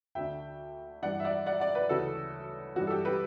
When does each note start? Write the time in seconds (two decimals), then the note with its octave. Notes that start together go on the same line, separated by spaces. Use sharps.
0.15 D2 D3 E5 G5
1.02 G2 E3 D5 F#5
1.20 E5
1.24 D5 F#5
1.46 D5 F#5
1.60 D5 F#5
1.75 B4 D5
1.89 D2 C#3 E3 F#4 A4
2.76 G2 E3 F#4
2.87 A4
2.91 G4
3.05 G4 B4